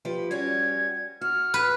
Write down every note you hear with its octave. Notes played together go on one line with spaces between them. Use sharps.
F3 G4 B4
G3 C#4 F#4 G#6
F#4 F6
B4